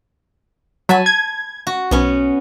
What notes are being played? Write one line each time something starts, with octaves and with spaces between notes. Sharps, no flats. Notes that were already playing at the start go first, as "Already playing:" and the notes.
F#3 G#5 A5 B5
G#6
F#4
B1 B3 C#4 C#5